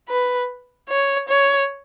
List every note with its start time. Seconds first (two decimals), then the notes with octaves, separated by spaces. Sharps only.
0.09 B4
0.89 C#5
1.29 C#5